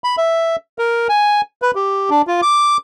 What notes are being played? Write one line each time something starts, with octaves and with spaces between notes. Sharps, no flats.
B5
E5
A#4
G#5
B4
G4
D4
F4
D6